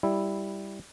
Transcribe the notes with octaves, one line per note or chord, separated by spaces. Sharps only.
G3 E4